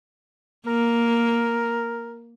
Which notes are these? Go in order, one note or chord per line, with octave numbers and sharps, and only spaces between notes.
A#3 A#4